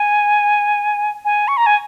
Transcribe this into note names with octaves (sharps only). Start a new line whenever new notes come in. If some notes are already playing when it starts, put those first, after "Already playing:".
Already playing: G#5
G#5
C#6
A#5
G#5